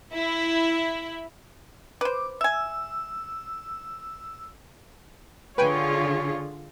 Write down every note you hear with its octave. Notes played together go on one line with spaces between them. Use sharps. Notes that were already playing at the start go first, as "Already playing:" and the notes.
E4
B4 C5 D6
E5 G#5 E6
D3 F4 G#4 B4 C#5 G5 G#5